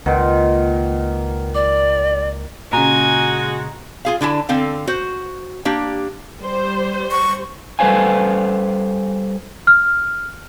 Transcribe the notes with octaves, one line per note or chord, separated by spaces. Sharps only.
C#2 A#2 D#3 B4 F#5
D5 D6
A#2 C#3 G#3 F#4 G#5 A#5
F4 G#4 F5
D3 D4 E4 A5
D3 C4 A4 F5
F#4 C5
A#3 D4 G4
G3 C5
C#6
G3 A4 B4 C5 F5 G#5
F6